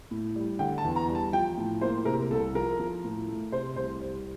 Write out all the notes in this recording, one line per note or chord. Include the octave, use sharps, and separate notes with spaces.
A2
G3
D3 G5
A5
E2
A#5
G3
A5
F3 G5
A2
A#3 C5
C3 A#4
C2 A4
F3 A#4
F3
A2
A3
C3 C5
C2 C5
G3